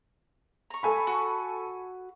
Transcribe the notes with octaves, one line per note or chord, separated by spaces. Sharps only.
A#5 C#6
A4 G#5 B5
F#4